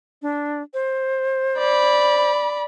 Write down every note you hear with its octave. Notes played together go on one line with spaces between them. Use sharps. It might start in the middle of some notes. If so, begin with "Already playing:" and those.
D4
C5
D5 B5